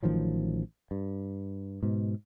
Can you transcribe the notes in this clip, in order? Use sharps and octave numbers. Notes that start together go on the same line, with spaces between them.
A1 D#3 F3 F#3
G2
G#2 B2